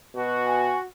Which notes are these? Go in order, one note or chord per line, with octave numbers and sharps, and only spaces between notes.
B2 F#4
G#5